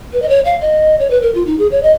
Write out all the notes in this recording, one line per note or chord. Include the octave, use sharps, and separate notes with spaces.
B4
D#5
C#5
F5
D#5
C#5
B4
A#4
F4
D#4
G#4
C#5
D#5